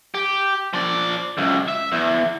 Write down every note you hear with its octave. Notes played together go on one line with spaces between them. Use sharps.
G4
F3 D5
C#2 F#2
E5
E2